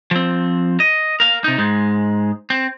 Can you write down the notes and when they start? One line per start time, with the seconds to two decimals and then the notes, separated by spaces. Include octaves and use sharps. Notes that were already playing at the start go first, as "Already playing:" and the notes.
0.11 F3 C4
0.80 D#5
1.20 A#4 F5
1.44 C3 D#4
1.58 G#2 G#3
2.50 C4